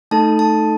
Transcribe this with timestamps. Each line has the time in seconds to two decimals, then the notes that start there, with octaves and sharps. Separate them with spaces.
0.11 A3 D#4 A4 A5
0.39 A5